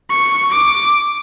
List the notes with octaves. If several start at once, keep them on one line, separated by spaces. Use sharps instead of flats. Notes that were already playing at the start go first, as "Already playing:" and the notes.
C#6
D6